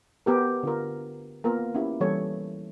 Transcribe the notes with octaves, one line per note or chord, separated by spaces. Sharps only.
B3 G4 A#4
D3 F4 A#4
A#3 B3 F4 A#4
C#4 E4 G4
E3 G3 A#3 A4 C#5